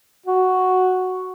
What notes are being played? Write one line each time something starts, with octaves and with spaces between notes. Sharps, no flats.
F#4